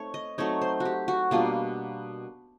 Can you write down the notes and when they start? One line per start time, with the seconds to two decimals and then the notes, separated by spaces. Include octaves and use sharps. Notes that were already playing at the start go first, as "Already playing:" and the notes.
Already playing: A3 C4 D#4 C#5
0.14 D#5
0.38 F#3 A3 C4 D#4 C#5
0.62 C5
0.80 F#4
0.85 G4
1.08 F#4
1.31 B2 G3 A#3 D4 F4